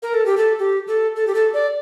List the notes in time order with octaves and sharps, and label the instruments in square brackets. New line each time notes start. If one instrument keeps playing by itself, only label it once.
[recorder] A#4
A4
G4
A4
G4
A4
A4
G4
A4
D5